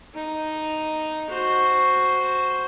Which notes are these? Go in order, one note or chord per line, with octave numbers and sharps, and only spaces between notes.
D#4
F#4 C5